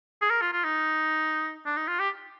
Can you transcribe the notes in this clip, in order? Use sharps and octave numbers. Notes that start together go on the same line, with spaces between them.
G#4
A#4
F4
F4
D#4
D4
D#4
F4
G4